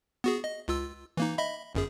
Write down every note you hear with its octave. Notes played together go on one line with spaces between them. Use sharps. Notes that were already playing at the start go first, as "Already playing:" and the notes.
B3 F#4 G#4
D#5
C#2 F4 E6
E3 A#3 D#4
D#5 E5 B5
G1 F#2 G#4